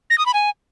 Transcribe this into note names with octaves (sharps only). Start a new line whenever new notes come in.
A#6
D#6
B5
G#5